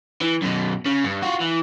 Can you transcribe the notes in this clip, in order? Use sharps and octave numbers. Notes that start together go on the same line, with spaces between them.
E3
F#2 B2
C#3
G2
F4 F#4
E3